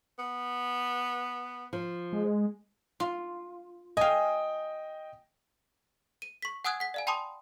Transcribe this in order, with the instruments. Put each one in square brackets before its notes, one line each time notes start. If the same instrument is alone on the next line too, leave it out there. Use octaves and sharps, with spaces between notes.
[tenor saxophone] B3
[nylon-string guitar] F3
[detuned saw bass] G#3
[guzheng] F4
[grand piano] D#5 G5 [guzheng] F5 G#5
[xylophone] D#7
C#6 B6
F#5 G#5 D#6 E6 F#6 G#6
F#5 B6
D5 F5 G#5
G5 A5 B5 C6 D6 D#6